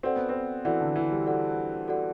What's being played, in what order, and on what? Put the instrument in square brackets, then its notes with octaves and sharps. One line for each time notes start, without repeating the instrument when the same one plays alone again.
[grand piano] C4 [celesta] F#4 A4 D5 F#5
[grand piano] B3
C4
[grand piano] E3 [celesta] F#4 A4 D5 F#5
[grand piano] D3
E3
G3
[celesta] F#4 A4 D5 F#5
F#4 A4 D5 F#5